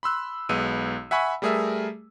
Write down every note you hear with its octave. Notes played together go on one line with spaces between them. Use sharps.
B5 C6 E6 F#6
B1 G#3 B3 E6 D#7
E5 F#5 G#5 B5 C#6
G3 A3 G#4 A#4 E5